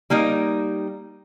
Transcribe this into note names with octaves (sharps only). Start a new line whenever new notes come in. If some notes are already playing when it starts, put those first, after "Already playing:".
G3 A#3 D#4 D#5